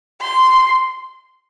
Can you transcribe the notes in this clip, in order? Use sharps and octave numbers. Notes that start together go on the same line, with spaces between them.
C6